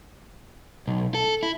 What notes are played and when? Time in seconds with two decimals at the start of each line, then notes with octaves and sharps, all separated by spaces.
0.88 B1
1.14 A4
1.43 E4